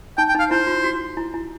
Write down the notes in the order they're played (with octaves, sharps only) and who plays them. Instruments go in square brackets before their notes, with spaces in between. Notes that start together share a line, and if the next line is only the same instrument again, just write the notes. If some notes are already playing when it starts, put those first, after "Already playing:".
[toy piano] D#4 [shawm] G5
[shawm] G5
[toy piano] D#4 [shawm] F5
[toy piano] E4 [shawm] C5
[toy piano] F4
F#4
E4
E4